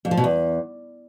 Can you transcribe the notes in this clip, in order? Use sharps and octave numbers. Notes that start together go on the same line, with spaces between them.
F2
F3
B2
E2